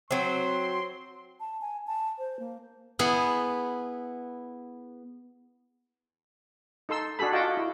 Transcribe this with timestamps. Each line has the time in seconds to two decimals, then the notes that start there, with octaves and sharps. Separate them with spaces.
0.11 F#3 C4 C6
1.40 A5
1.61 G#5
1.87 A5
2.18 C5
2.39 A#3
2.99 B3 E4 G#4
6.89 D#4 A4 C6 E6
7.19 D4 F#4 G#4 A4 B5
7.32 F4 F#4 D#5 G5 A5
7.57 E4